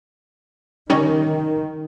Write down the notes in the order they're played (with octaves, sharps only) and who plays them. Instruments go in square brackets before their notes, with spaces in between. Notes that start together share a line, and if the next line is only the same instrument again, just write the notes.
[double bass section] D#3 [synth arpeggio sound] G3 C#4 D#4